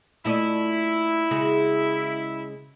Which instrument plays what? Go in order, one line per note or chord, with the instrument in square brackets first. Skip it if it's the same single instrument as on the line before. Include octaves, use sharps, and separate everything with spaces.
[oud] A#2 A3 D#5 [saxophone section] E4
[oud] C#3 G#3 F#4